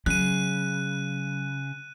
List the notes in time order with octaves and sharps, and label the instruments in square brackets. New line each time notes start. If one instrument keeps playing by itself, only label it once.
[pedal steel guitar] C#3 [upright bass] F#3 [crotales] F#6 D#7